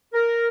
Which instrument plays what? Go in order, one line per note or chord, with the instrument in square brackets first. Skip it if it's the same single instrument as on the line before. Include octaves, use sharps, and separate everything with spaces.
[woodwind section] A#4